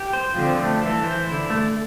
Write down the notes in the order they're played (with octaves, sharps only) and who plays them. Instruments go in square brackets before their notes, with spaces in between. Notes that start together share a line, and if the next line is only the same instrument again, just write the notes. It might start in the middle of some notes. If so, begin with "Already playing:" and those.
Already playing: [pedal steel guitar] G4
C5
[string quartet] D3 F3 [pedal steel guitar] C4
[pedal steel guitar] A3
[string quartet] E3 [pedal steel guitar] A4
[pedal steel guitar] C5
[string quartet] D3 [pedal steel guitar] E4
[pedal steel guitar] A3